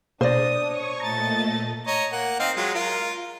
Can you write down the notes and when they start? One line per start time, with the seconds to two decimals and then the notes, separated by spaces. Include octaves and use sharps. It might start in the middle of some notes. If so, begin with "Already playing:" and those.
0.21 B2 D4 C5 D5 D#6 A#6
0.65 C#5 C#6
1.00 A#2 A3 D#5 A5 A#5 A6
1.87 C#5 D#5 A#5
2.12 A#3 F#5
2.40 C4 D#4 F5
2.56 F#3 G#3 F4
2.74 F4 A#4